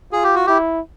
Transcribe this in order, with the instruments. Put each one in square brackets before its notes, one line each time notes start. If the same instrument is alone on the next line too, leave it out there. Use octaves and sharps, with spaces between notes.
[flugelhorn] F4 [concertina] G#4
[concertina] G4
F#4
[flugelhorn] E4 [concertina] G4